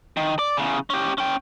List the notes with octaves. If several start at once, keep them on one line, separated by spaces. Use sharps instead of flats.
D#3
D5
E2 C#3
C#4 G4
C#4 G5